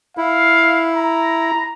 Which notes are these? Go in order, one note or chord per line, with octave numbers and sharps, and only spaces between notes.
E4 F5
A#5